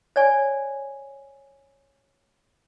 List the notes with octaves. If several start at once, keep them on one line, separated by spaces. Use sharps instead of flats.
C#5 D5 G#5